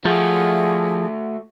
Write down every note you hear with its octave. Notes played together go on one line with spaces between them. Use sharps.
F3 A3 F#4 G#4